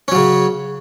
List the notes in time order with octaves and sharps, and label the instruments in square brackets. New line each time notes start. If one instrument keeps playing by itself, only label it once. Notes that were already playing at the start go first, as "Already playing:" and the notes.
[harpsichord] C#4
F#3
C#3